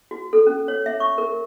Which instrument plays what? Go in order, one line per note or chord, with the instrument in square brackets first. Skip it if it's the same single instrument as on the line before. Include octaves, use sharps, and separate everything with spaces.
[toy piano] F#4
A4
C#4
C#5
E5
C#6
A#4